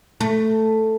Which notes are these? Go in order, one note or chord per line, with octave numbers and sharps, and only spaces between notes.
A3